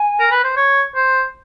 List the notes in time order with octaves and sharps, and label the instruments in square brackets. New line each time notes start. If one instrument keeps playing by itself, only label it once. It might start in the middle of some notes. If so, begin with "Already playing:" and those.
Already playing: [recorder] G#5
[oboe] A#4
B4
C5
C#5
C5